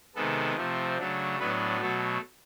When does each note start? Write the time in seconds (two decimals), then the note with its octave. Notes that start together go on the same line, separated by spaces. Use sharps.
0.15 C3 D#3 G#3 B3 A4
0.56 C3 F3 A3 C4
0.97 C#3 F#3 A3 D4
1.39 A2 F#3 B3 D4 B4
1.80 B2 F#3 A3 A4